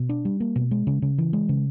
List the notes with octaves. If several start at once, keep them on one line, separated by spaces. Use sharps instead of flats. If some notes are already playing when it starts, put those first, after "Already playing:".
Already playing: B2
D4
G3
A#3
B2
G#3
C#3
C#3
E3
G#3
C#3